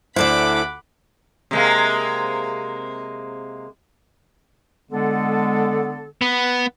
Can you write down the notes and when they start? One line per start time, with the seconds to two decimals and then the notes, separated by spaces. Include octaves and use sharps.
0.16 D2 E4 A4 C5 D5 F#5 B5 D6
1.51 C3 G#3 A#3
4.91 D3 G#3 B3 A4
6.21 B3